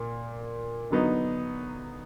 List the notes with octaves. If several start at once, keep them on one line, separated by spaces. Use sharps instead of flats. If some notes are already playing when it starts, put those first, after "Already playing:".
Already playing: A#2 A#3
D3 F#3 B3 D#4